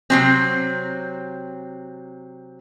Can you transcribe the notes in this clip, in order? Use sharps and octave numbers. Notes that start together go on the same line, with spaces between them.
C3 F#3 C4